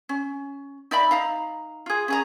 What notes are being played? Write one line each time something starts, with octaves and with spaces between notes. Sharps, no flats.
C#4
D#4 D5 E5 B5
D#4 F5 A#5
F4 G#4
C#4 G#4 A#5